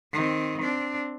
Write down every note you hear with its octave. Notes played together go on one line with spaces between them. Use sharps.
D#3 C4
C4 D4